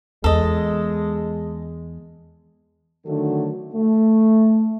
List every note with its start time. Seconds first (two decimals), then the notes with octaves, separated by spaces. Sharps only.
0.24 E2 G#3 A4 D#5
3.06 D3 D#3 F#3 A3 F#4 A4
3.74 A3